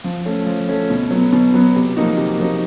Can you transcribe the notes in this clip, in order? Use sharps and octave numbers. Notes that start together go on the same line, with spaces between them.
F3
A3 C#4
F3
A3 C#4
B2
F#3 B3
B2
F#3 B3
C3
F3 A#3 D#4 F#4
C3
F3 A#3 D#4 F#4